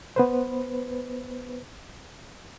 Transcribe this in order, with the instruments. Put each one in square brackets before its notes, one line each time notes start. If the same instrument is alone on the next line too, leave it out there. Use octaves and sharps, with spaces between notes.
[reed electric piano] B3 B4 C5